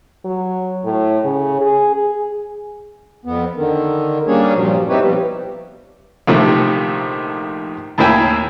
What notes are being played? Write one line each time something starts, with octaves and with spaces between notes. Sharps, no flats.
F#3
A2
C#3
G#4
G#4
F2 B3
D3 D#3
G3 A#3 C#4 D4 G#4 C#5
G2 A#2 F3 F#3
C4 D#4 E4 G4 B4 C#5
B2 F3 G3
A#1 C3 D#3 F3 A3
D#2 A2 A#3 E4 G5 G#5